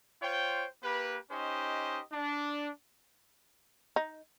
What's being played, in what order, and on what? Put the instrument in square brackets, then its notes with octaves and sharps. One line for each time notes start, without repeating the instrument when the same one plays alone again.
[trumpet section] F4 C5 C#5 G5
A#3 G4 B4
C#4 D#4 G4 C5 D#5
D4
[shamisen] D#4